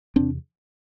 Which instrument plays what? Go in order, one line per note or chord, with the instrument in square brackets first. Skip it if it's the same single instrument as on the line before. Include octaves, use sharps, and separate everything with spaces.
[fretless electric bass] E2 C3 C4 D4